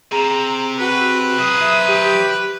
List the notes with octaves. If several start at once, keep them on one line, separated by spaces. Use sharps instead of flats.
C3 G#4 A#5 E7
F#4 B4
F#3 C5 D#6
E5
G4